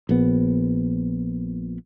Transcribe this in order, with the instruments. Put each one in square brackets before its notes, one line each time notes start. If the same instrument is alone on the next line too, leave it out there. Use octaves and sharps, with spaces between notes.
[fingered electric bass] A#1 B3